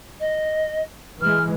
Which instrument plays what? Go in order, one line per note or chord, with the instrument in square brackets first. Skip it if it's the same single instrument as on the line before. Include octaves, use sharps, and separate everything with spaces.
[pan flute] D#5
[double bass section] E3 G#3 [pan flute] F6